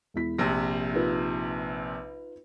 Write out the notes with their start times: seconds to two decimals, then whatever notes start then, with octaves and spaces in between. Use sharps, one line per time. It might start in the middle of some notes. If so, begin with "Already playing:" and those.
0.14 E1 E4 B6
0.38 A#1 C3 C6 A#6
0.94 D#4 F4 B4